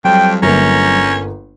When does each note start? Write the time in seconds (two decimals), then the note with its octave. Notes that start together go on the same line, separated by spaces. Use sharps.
0.05 F2 F#3 G3 G5
0.43 G1 A#3 C#4 A#5